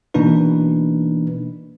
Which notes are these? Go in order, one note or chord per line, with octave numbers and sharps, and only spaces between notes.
B2 E3 A#3 D4 D#4 B4